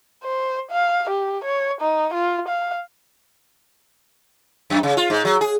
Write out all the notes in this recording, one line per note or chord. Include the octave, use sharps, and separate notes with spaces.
C5
F5
G4
C#5
D#4
F4
F5
F#2
C#3
F4
G#2
F#3
G#4